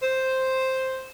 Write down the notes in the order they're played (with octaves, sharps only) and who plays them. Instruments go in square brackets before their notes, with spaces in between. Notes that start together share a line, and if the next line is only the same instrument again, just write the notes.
[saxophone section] C5